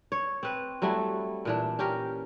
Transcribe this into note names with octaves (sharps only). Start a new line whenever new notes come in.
C#5
C4 B4
F#3 G3 A3 E4
A#2 E3 D4
C#4 G4 A#4